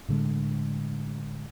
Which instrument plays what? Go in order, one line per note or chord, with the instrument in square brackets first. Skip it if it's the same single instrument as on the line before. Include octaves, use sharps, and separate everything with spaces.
[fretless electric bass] A2 D3 G#3